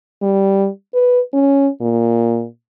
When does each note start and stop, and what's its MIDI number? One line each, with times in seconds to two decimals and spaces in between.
0.22 0.68 55
0.94 1.20 71
1.33 1.68 61
1.81 2.46 46